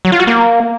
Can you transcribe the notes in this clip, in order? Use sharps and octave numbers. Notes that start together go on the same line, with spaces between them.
F#3
F4
F#4
A#3